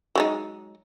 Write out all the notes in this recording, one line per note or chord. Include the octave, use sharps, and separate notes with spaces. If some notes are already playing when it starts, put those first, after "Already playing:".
F#3 G#3 D#4